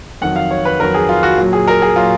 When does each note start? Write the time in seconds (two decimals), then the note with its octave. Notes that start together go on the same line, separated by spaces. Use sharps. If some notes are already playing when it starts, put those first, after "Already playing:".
0.21 F2 D#3 F#3 F#5
0.36 F5
0.51 C#5
0.65 B4
0.80 F2 D#3 F#3 A#4
0.94 G#4
1.09 F4
1.23 F#4
1.38 A#2 F#3
1.53 G#4
1.68 A#4
1.82 G#4
1.96 A#2 F#3 F4